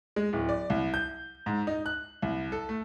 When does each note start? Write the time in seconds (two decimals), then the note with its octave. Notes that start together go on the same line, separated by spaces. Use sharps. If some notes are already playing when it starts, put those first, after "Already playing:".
0.16 G#3
0.33 D1
0.49 D5
0.70 C2
0.94 G6
1.46 G#2
1.67 D#4
1.86 F#6
2.22 C2
2.52 A4
2.69 A3